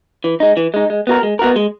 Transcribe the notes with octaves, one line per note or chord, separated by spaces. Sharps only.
E3
G#3 D#4
E3
G#3 D#4
G#3
B3 F#4 A#4
G#3
B3 F#4 A#4
G#3